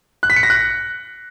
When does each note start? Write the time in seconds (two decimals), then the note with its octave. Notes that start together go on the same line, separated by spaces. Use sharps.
0.23 F#6
0.30 B6
0.36 C#7
0.43 A#6
0.50 F#6